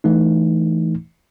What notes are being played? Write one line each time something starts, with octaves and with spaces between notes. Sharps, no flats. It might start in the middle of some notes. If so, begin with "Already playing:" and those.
E3 A3 D#4